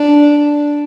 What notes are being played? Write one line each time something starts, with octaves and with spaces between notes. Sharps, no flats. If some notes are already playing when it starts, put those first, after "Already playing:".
Already playing: D4